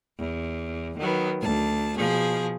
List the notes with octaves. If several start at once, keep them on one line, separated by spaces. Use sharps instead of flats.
E2
D#3 F#3 B3
D2 A5
B2 F3 G#4